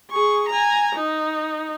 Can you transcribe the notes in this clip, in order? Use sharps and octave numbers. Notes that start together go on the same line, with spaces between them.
G#4 C#6
G#5 A#5
D#4